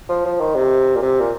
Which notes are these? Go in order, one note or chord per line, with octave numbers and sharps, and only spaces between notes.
F3
F3
D#3
C3
A#2
C3
A#2